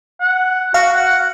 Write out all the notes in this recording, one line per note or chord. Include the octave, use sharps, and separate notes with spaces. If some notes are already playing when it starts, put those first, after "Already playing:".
F#5
F#4 F5
F#5